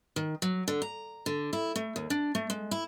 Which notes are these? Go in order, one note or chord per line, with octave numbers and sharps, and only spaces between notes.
D#3
F#3
D3
A#5
D3
E4
A3
D#2
D4
A3
G#3
E4